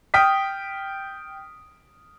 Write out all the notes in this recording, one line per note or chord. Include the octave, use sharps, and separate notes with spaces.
G5 D#6 F6 B6